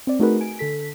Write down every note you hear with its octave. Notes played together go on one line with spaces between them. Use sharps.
C4 D5
A3 D#4 F#4 G#4 A#4 B4
G#5 D7
D3 A4 B6